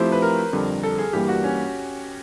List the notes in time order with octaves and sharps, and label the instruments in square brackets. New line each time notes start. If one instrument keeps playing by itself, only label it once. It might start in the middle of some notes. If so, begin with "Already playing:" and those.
Already playing: [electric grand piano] F3 A3 C4 E4 G4 [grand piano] C5
[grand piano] B4
A#4
[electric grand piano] F2 D3 G3
[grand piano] A4
G#4
[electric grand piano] G2 E3 G3 A#3 [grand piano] G4
[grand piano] F#4
C#4